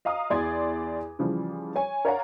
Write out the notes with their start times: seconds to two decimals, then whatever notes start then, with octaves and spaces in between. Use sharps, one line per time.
0.05 D#5 F5 A#5 D#6
0.30 E2 D5 C6 D6 G#6
1.19 C#3 E3 F3 G3
1.76 C#5 G#5
2.05 A#4 C#5 D5 F5 F#5 A#5